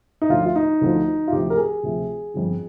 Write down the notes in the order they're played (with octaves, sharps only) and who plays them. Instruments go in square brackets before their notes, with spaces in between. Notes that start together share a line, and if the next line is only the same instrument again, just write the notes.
[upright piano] D#4
D2 D3 F3 F4
F4
D#4
D2 D3 F3
F4
D2 C3 F3 G4
A#4
G#4
D2 C3 F3
G1 F2 D3 F3